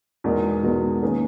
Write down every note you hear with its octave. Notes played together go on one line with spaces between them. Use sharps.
E2 B2 G#3 D#4 A#4
E2 B2 G#3 D#4 A#4
D#3 A#3 C#4 G#4 B4